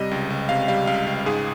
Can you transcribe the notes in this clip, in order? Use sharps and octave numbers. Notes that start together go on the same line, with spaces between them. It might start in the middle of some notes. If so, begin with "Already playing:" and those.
Already playing: C3 G3 D#5
C#2
C#2
C3 F5
G3 F5
C#2 F5
C#2
G#2 G#4